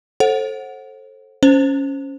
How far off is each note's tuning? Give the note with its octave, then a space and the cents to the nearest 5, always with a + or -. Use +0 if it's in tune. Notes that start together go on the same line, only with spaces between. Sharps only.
A4 +0 C5 +35 F#5 -5
C#4 +0 C5 +0